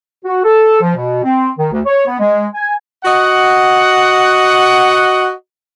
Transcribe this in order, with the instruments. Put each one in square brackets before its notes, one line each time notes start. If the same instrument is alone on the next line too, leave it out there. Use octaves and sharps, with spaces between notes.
[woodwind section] F#4
A4
F3
B2
C4
D#3
D2
C#5
B3
G#3
G#5
[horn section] F#4 D#5 F#5